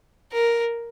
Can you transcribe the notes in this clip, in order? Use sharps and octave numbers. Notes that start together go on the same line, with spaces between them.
A#4